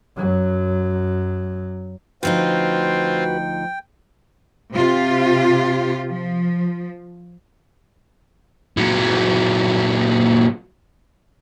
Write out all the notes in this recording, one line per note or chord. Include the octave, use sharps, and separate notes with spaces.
F#2 F#3
D2 F3 C4 D#4 F4 F#4 B4 G5
C3 F4 G4
F3
A#2 F#3